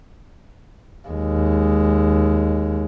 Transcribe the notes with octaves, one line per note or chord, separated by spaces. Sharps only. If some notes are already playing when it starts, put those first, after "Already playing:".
D#2 G#3